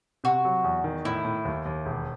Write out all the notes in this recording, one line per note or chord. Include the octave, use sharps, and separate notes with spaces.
C3 F#4
F#3
E2
D#3
A2 E4
A2
D#2
D#2
E1